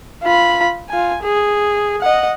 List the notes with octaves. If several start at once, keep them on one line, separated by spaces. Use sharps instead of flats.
F4 B5
F4 G#5
G#4
D#5 F#5